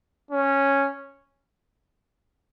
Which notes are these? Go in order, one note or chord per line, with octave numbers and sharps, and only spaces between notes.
C#4